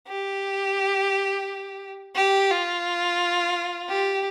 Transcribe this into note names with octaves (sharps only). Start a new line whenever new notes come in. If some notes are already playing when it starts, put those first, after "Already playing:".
G4
G4
F4
G4